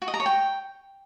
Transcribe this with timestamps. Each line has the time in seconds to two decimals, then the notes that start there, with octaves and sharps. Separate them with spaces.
0.02 F#4
0.08 D#5
0.14 A#5
0.20 C#5
0.26 G5